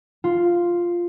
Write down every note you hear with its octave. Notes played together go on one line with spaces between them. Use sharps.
F4